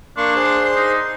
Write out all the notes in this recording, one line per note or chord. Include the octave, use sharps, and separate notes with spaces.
A#3 D4 C6 C#6
G#4 C5 C6
D#4